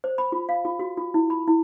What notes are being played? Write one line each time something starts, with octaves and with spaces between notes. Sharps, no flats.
C5
B5
F4
F5
F4
F#4
F4
E4
B5
E4